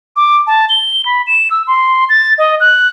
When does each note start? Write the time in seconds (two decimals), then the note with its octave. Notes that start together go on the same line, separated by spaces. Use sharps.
0.16 D6
0.47 A5
0.69 G7
1.06 B5
1.27 E7
1.51 E6
1.67 C6
2.09 A6
2.38 D#5
2.60 F#6